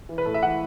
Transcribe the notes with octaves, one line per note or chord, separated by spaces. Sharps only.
E3
B4
A2 A4
E5
E3 F#5